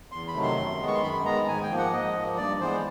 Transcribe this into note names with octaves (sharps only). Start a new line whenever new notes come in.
E2 C6
B5
C3 D#3 F#3 A3
C6
F#2
D#3 G#3 B3
C#6
C6
F#2 B5
D#3 G#3 B3 A#5
G#2 G#5
G5
F3 A#3
F#5
G#2 D#5
F3 A#3
G2 D5
E3 G#3 B3 C5